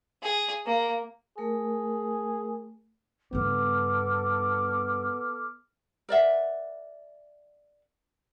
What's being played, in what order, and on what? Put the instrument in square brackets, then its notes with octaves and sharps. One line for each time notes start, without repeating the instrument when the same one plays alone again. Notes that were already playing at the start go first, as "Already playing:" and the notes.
[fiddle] G#4
A#3
[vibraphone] A3 A#4 [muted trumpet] G#4
[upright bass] G2 C#3 [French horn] B3 [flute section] A4 D6 F6
[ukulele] A#4 D5 E5 F#5